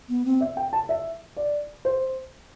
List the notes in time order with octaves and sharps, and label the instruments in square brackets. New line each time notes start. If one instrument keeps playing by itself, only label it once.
[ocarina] B3
C4
[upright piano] E5
G5
A5
E5
D5
C5